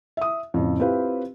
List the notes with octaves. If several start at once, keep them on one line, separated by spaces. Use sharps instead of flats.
E5 D#6
F2 A2 C#3
C4 E4 F4 G4 B4 F5